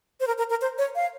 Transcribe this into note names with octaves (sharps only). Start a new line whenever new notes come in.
C5
A#4
A#4
A#4
C5
C#5
F5